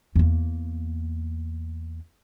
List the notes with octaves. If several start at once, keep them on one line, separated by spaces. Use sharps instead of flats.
E2 A#3